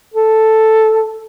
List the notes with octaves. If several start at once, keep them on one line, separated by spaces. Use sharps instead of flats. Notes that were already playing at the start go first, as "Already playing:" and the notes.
A4